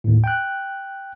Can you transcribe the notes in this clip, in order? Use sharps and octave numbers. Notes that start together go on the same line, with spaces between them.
D#2 A2
G5 F#6